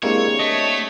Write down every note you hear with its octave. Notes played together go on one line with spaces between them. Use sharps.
G#3 A#3 C4 D4 E4 G4 C#5
A3 D#5